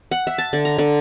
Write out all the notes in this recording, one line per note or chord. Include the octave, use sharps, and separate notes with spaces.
F#5
E5
A5
D3
A#5
D3